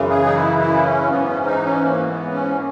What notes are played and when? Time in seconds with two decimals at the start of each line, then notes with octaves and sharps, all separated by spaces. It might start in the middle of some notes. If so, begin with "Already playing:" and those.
Already playing: F#2 C#3 E3
0.10 G#4
0.25 D#4
0.34 E4
0.59 E4
0.83 C#4
1.08 G#2 E3 B3
1.26 C#4
1.45 D#4
1.64 C#4
1.82 A#3
2.07 B3
2.31 C#4
2.56 A#3